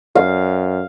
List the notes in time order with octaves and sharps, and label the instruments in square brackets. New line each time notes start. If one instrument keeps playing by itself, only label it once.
[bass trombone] F#2 [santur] F5